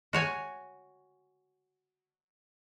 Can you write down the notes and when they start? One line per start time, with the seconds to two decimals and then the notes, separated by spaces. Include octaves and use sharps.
0.13 F#4 C#5 G#5